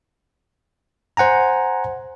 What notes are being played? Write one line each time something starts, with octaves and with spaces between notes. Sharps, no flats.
C5 F#5 G#5 A#5